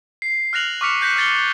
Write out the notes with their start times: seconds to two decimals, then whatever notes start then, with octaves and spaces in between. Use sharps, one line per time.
0.22 C7
0.53 F6 F#6 A#6 F7 F#7
0.81 C#6 D6 F6 B6 C#7 F7
1.01 F#6 G6 A#6 B6 C#7
1.16 F6 G6 A6 C#7 G7